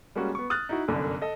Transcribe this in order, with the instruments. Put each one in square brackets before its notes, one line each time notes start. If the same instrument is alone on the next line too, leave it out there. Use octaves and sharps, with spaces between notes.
[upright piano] G3 G#3 A#3 C#4 F#4
B3 C#6
D#6 F6 F#6 A6
D#4 E4 F#4
G1 C2 F#2 D3
A4 D#5